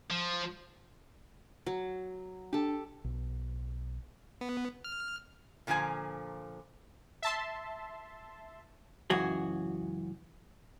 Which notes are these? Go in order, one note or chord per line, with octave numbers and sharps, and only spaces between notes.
F3
F#3
D4 G4 A4
B1
B3
F6
A#2 D3 F3 C#4 G#5 A#5
E5 A5 C6
C#2 F#2 E3 F#4 G#4